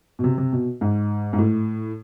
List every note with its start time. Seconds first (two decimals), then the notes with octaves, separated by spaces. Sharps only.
0.19 B2
0.24 C3
0.38 C3
0.52 B2
0.81 G#2
1.33 G#2
1.38 A2